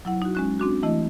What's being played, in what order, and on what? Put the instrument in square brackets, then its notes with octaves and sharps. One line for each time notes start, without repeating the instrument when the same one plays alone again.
[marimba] F#3 E4 F#5
D#4 F#4
G#3 C#4 F#6
C4 D4 F#4
E3 A3 E4 D#5